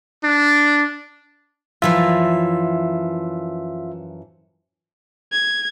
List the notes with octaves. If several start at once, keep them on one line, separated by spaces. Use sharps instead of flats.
D4
F#2 E3 F3 F4 E5
G#6